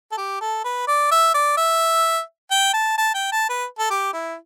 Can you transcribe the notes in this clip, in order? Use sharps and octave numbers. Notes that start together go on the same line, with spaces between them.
A4
G4
A4
B4
D5
E5
D5
E5
G5
A5
A5
G5
A5
B4
A4
G4
E4